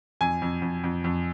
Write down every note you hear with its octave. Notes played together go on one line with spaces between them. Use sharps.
F2 G#5
F2
F2
F2
F2